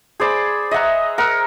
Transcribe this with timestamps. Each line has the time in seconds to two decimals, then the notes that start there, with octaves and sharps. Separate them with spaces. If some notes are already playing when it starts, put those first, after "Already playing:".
0.20 G#4 C5 D5 B5
0.71 D#5 E5 F#5 A#5
1.18 A#4 F#5 E6